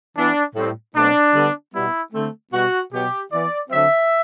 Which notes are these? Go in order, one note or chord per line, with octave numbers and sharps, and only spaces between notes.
E3 B3 D4
A2 G3 C4
B2 F#3 A3 C4 D4
D3 G3 B3
B2 G3 B3 E4
D3 A3 C4
B2 G3 B3 F#4
B2 F#3 B3 G4
E3 B3 D5
D3 F#3 C4 E5